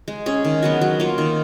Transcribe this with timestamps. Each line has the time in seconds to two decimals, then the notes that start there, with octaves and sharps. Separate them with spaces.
0.08 G#3
0.26 C#4 G#4
0.44 D#3
0.62 F#3 B3 F#4
0.81 F#3
1.00 A#3 F4
1.18 D#3